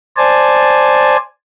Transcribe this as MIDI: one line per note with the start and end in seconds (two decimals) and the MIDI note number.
0.17 1.17 72
0.17 1.17 74
0.17 1.17 80
0.17 1.17 81